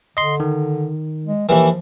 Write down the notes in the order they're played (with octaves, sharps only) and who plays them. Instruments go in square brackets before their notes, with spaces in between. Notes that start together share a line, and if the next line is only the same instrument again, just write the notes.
[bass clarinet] D3 [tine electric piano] D#5 C6
[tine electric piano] D#3
[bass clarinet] G#3
[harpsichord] D#2 E3 [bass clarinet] F3